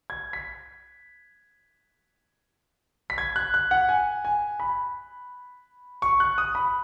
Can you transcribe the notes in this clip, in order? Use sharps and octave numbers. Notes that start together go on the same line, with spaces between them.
G#6
B6
B6
G#6
F#6
F#6
F#5
G#5
G#5
B5
C#6
F#6
D#6
B5